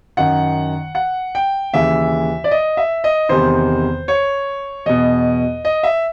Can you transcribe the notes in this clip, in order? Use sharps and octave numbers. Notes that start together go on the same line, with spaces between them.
F#2 D#3 F#5
F#5
G5
D#2 C#3 E3 E5
D5
D#5
E5
D#5
E2 C3 D#3 C5
C#5
E2 B2 D#5
D#5
E5